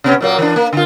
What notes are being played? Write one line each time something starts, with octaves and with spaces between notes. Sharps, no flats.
C3 B3 C#4
A#2 F#3 A#3
E3 D4
A#3
D3 F4